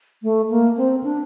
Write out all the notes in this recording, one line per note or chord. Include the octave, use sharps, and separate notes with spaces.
A3
A#3
C4
D4